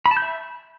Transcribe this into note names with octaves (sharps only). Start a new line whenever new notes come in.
B5
A5
G6
E5